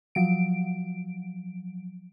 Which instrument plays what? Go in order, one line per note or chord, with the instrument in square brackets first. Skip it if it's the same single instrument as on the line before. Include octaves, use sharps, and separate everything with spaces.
[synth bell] F3 F#3 D7